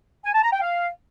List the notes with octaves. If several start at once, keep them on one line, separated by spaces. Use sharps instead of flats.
G#5
A5
A#5
G5
F5